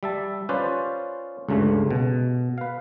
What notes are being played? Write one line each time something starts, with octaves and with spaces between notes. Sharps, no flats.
G3 E5 A5
C#4 F4 B4 C5 D5
C#2 G2 C#3 A3
B2
B4 F5